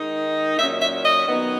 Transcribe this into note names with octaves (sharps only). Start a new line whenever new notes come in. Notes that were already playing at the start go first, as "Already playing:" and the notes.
Already playing: D#3 G#3 D#4
A#2 F#3 C#4 E5
E5
D#5
D#3 F#3 B3 D#4